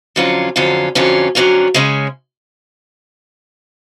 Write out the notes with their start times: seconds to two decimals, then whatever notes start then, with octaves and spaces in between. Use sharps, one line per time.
0.16 F2 D3 F#3 C#4 F4
0.56 F2 D3 F#3 C#4 F4
0.95 F2 D3 F#3 C#4 F4
1.35 F2 D3 F#3 C#4 F4
1.74 C#3 G#3 C#4